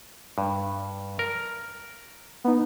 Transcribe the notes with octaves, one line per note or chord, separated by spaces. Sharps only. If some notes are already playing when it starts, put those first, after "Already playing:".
G2
A#4
B3 D#4